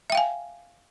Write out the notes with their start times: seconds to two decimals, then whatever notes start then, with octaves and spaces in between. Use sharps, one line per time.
0.10 E5
0.12 G5
0.15 F5
0.17 G#5